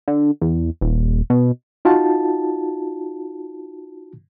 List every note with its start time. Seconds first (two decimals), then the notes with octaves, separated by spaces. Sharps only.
0.08 D3
0.41 E2
0.81 D#1
1.30 B2
1.85 D#4 F4 F#4 A5